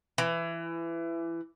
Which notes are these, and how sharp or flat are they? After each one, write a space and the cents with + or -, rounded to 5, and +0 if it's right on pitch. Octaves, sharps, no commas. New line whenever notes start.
E3 +20